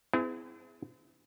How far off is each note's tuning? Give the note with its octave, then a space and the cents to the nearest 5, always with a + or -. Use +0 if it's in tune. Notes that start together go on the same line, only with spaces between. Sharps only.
C4 -45 E4 +0 G#4 +0